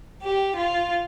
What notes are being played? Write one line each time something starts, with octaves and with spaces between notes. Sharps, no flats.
G4
F4